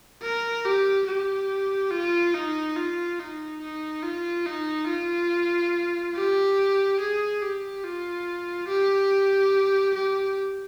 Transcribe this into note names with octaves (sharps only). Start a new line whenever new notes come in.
A#4
G4
G4
F4
D#4
F4
D#4
D#4
F4
D#4
F4
G4
G#4
G4
F4
G4
G4